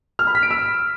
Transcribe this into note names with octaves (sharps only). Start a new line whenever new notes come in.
F6
B5
B6
D7
E6